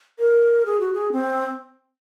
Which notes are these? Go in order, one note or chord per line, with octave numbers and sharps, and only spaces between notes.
A#4
G#4
F#4
G#4
C4